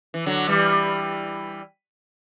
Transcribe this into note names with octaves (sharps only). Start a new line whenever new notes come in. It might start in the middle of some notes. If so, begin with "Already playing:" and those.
E3
D3 F#3
E3 G3